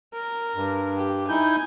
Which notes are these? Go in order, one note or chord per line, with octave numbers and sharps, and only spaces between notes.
A#4
G2
G4
D#4 E4 G#5 G6